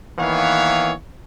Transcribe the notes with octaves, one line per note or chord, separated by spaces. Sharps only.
D#3 E3 A#3 B3 C#5 F5